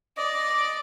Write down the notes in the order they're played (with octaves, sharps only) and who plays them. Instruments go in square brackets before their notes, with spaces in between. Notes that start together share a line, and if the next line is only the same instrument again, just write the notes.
[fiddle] D5 [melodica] D#5